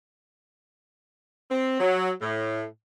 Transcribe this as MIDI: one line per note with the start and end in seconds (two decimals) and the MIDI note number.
1.51 1.80 60
1.80 2.10 54
2.21 2.64 45